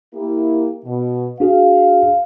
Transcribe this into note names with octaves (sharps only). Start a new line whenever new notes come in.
A#3 E4 G4
B2
D4 F#4 G#4 F5